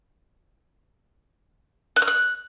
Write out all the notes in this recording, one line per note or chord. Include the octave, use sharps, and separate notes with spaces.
F#6
F6
F#6